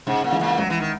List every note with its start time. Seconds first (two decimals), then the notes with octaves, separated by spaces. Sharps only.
0.06 G#2 C#3
0.24 A#2
0.32 E3 G#3
0.41 A#2
0.58 C#2 F#3
0.70 E3
0.80 D#3